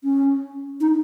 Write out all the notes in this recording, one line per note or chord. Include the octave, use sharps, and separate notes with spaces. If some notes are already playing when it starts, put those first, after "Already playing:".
C#4
D#4